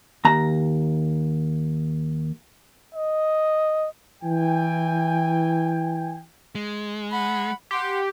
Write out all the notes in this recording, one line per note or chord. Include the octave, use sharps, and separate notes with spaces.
D#2 A#5
D#5
E3 G5 G#5
G#3
F#5 B5
G4 F#5 C6